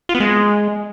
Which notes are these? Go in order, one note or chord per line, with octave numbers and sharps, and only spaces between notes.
F4
B3
G#3